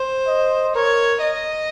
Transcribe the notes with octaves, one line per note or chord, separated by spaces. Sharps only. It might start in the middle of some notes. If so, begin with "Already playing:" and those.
Already playing: C5
D#5
A#4 C#5
D#5